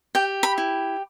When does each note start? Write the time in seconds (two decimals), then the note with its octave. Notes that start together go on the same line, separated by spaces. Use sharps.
0.15 G4 G5
0.43 B5
0.58 E4